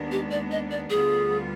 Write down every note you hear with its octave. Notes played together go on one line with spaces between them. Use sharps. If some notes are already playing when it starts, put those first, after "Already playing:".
Already playing: D#2 D#3 G#3 B3 D4
G4
D5
D#5
D5
D2 D3 G3 B3 F4 G#4